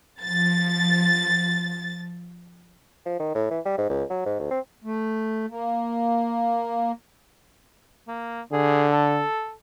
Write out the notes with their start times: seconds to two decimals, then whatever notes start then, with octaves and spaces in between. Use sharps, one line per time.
0.22 F3 A6
3.06 F3
3.20 D#3
3.35 A2
3.50 E3
3.65 G3
3.78 G#2
3.89 C#2
4.10 F#3
4.26 G#2
4.40 D2
4.51 C4
4.84 A3
5.51 A#3
8.08 A#3
8.53 D3 G#4
8.92 A4